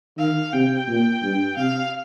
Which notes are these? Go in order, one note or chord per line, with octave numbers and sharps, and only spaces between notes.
D#3 F5
C3 G5
A#2
G2
C3 F5